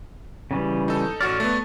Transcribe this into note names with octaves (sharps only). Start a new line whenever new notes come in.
C#3 E3 G3
D#4 A4
A1 F#4 A4 C#5 D5 F6
A3 B3